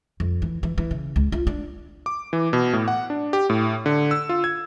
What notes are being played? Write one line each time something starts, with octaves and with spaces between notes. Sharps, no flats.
F2
E3
E3
E3
C#3
C#2
F4
D4
D6
E3
B2
A2
F#5
D4
G4
A2
D3
E6
F4
G#6